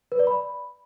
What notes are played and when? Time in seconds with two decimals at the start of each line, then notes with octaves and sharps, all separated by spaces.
0.12 B4
0.19 D5
0.27 B5